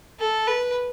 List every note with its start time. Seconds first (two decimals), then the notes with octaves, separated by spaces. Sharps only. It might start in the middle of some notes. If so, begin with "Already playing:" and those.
0.19 A4
0.47 B4